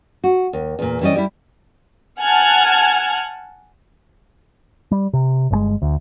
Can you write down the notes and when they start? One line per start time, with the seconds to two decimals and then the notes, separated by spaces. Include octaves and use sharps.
0.24 F#4
0.53 D#2
0.79 E2 A#2
1.01 E3 G3 C#4 D5 D#5
1.16 G3 E4
2.20 F#5 G#5 A5 F6 F#6 G#6
4.91 G3
5.13 C3
5.50 G1 A#2 G#3
5.82 D2